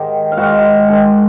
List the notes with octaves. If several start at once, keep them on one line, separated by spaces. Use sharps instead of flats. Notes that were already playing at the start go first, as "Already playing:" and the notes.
Already playing: G#2 D#3 G#3 G4 G5
F5
G#2 D#3 G#3 F#4 F#5
G#2 D#3 G#3